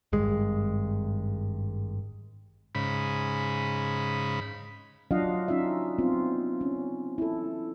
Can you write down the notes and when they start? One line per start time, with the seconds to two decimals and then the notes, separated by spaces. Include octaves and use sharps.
0.13 G#1 G2 G#3
2.75 G#2 C#3 B5
5.11 F#3 D4 F4 D#5 F5 F#5
5.48 C#4 D#4 F4 E5
5.99 B3 C4 F4
6.61 C#4
7.18 E4 A4